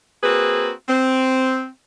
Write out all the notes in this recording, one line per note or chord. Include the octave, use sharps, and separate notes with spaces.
A#3 C4 F#4 G#4 B4
C4